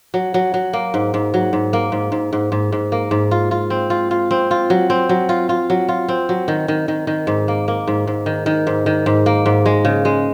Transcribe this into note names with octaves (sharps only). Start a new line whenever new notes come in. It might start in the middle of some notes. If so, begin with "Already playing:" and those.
F#3
F#3
F#3
A#3
G#2
G#2
F#3
G#2
A#3
G#2
G#2
G#2
G#2
G#2
A#3
G#2
F4
F4
C4
F4
F4
C4
F4
F#3
C4
F#3
F4
F4
F#3
F4
C4
F#3
D#3
D#3
D#3
D#3
G#2
A#3
A#3
G#2
G#2
D#3
D#3
G#2
D#3
G#2
A#3
G#2
G#3
C#3
G#3